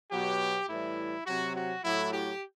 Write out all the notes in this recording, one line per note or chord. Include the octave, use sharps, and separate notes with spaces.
B2 F#3 G4
A2 E3 G3 E4
C3 F#3 F#4
F#4
A2 F#3 E4
G4